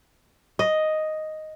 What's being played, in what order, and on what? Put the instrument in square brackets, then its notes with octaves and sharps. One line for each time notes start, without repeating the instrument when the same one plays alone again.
[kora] D#5